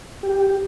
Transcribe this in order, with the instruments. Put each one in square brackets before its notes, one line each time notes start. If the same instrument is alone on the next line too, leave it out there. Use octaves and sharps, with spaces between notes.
[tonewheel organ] G4